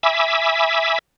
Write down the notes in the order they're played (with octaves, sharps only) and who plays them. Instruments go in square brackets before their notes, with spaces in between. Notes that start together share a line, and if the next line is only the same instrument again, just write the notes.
[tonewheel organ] E5 G#5 B5 D6 E6